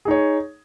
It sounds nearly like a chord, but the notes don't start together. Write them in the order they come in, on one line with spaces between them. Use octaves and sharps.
G#4 D#4 C#5